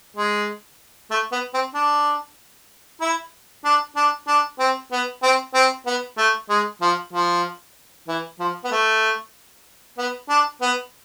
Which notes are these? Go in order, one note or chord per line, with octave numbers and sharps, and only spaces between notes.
G#3
A3
B3
C4
D4
E4
D4
D4
D4
C4
B3
C4
C4
B3
A3
G#3
F3
F3
E3
F3
B3
A3
B3
D4
B3